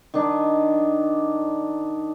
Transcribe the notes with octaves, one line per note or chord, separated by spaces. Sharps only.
D#3 D4 D#4